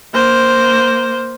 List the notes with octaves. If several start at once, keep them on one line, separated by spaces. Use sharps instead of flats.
A#3 C5